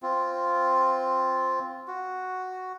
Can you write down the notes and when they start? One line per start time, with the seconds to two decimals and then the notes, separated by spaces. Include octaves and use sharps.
0.02 C4 F4
1.88 F#4